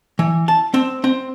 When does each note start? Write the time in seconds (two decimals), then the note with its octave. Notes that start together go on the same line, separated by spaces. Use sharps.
0.19 E3
0.48 A5
0.74 C4
1.04 C4